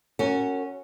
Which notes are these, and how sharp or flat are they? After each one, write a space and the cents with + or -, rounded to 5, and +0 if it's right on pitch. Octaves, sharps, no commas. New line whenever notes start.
C#4 -5 F#4 +5 A#4 -30